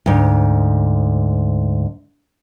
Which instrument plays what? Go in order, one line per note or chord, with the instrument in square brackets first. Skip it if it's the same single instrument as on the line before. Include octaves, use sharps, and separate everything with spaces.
[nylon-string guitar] D2 G#2